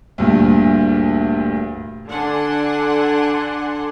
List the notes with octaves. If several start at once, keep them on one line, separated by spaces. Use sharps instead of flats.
D2 G2 A#2
D3 D4 F#5 G#5 C6